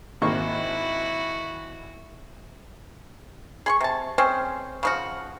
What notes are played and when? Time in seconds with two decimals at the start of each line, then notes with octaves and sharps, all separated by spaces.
0.22 G#1 A#3 E4 F#4 C#6
3.66 G#4 C6 C#6
3.81 C3 A5
4.18 C4 C#4 G#4 C5
4.83 C#3 F3 F#4